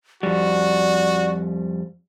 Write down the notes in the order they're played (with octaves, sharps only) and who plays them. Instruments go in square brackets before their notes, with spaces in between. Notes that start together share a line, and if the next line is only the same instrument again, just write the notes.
[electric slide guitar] F2 G3 [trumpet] F#4 [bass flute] D5